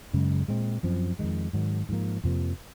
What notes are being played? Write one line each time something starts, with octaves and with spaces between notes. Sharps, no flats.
F#2 C#3 G#3
A#2 G#3 C4
F#2 F3 C4
F2 D#3 G#3
G#2 D#3 F#3
G#2 F3 A#3
F2 C3 F3 A#3